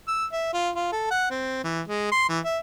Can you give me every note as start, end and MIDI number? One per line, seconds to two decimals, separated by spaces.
0.08 0.25 88
0.32 0.52 76
0.54 0.70 65
0.76 0.92 65
0.92 1.06 69
1.11 1.27 78
1.31 1.61 60
1.64 1.81 52
1.88 2.12 56
2.12 2.29 84
2.29 2.39 52
2.45 2.58 76